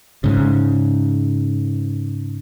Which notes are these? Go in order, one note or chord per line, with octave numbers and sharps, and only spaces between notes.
G#2 C#3